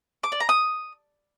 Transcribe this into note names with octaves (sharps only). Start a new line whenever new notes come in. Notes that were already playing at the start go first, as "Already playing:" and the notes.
D6
D5
A#5
D#6